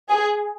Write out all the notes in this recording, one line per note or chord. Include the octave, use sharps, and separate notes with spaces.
G#4